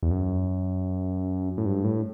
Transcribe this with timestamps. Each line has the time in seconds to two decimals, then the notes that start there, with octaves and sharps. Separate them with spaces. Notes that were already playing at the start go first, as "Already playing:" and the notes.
0.03 E2
0.11 F#2
1.58 A2
1.66 G2
1.84 A2